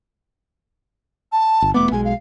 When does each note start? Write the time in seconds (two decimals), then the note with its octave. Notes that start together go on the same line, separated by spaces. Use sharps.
1.32 A5
1.62 G1
1.74 E1 A3 B3 D6
1.91 B1 G#3 G#5
2.04 F5